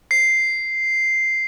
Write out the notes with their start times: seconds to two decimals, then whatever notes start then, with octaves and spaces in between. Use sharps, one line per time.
0.11 C7